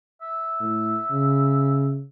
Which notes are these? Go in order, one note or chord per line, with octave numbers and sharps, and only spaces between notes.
E5
A2
C#3